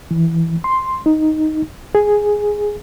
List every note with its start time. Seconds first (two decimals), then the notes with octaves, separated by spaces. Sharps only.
0.11 E3
0.64 C6
1.06 D#4
1.95 G#4